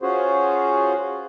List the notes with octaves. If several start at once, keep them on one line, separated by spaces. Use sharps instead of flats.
C#4 F4 F#4 G#4 C5